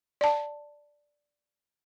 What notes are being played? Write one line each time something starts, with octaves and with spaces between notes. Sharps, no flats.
D5 A5